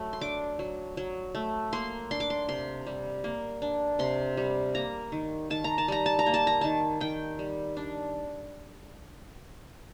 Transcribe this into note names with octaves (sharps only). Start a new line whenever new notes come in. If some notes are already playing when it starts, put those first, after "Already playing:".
Already playing: F#3 A3
C6
D4 D6
F#3
F#3
A3
A#3 C6
D4 C6
D6
C6
C3 C6
G3
A#3
D4
C3 C6
G3
A#3 A#5
D#3
D#3 A5
A#5
A5
G3 A#5
A5
A#5
A#3
A5
A#5
D#3 A5
D#3 G5
G3
D4